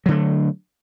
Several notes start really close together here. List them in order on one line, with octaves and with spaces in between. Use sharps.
F#3 D3 A3